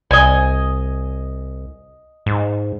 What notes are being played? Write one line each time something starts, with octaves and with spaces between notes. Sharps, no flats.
C2 D#5 G#5
G#2